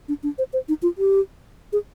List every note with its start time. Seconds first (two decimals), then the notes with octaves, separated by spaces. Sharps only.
0.08 D4
0.23 D4
0.38 C5
0.53 C5
0.69 D#4
0.82 F4
0.98 G4
1.73 G#4